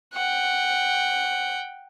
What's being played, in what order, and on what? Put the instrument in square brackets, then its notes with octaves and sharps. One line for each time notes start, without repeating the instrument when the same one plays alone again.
[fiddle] F#5 G5